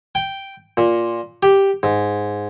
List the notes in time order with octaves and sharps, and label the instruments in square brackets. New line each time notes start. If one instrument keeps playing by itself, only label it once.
[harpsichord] G5
A#2
G4
G#2